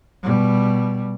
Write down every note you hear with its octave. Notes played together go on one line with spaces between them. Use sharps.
B2 G3